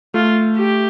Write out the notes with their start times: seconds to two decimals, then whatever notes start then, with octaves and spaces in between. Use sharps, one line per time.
0.14 A3 F4
0.57 G4